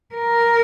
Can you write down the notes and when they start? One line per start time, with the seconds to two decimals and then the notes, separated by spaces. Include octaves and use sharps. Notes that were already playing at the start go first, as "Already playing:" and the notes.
0.15 A#4